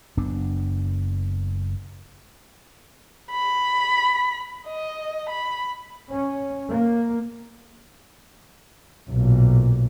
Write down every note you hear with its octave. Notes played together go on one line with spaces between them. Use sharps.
F#1 F#2 B3 D4
B5
D#5
B5
C#4
A#3
B1 A#2